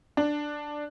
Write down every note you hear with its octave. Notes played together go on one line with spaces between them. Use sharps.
D4